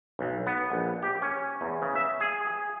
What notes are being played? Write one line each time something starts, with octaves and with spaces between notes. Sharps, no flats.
B1
B3
A#1
G4
C#4
E2
C#3
E5
G#4
G#4